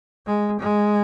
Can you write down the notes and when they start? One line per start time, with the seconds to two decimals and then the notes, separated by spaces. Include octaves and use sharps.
0.27 G#3
0.60 G#3